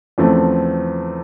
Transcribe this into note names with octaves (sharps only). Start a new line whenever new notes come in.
E2 C#3 F3 A3 C4